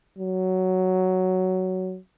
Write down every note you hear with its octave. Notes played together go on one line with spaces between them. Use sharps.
F#3